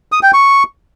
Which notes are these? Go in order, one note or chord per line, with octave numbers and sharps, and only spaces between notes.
D#6
G5
C#6